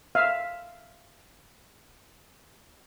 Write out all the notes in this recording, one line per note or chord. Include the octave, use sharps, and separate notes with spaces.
E5 F5